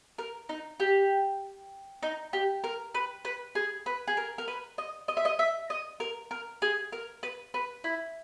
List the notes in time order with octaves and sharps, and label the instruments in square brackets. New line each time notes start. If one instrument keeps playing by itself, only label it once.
[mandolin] A#4
D#4
G4
D#4
G4
A#4
B4
B4
G#4
B4
G#4
A#4
A#4
B4
D#5
D#5
E5
D#5
E5
D#5
A#4
A#4
G#4
A#4
B4
B4
E4